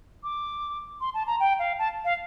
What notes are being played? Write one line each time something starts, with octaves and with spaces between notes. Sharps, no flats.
D6
C6
A5
A#5
G5
F5
A5
F5